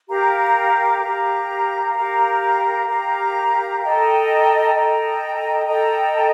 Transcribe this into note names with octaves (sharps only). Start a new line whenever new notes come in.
G4 A#4 F5 A#5
G4 A#4 F5 A#5
G4 A#4 F5 A#5
G4 A#4 F5 A#5
A4 D#5 G5 A#5
A4 D#5 G5 A#5
A4 D#5 G5 A#5